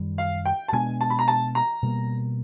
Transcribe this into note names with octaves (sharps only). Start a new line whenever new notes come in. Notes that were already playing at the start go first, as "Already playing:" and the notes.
Already playing: F#2 D#3 G3
F5
G5
A5
B2 G#3 B3 D4 G#5
A5
B5
A#5
A5
A#5
B2 G3 A#3